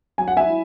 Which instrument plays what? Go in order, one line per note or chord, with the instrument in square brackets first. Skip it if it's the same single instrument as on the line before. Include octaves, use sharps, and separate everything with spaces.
[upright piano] F#3 G#5
F#5
E5 G#5
E4